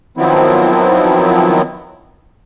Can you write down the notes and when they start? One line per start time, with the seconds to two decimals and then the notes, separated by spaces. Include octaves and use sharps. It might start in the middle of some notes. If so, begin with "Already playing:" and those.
0.17 D#3 F3 F#3 B3 C4 E4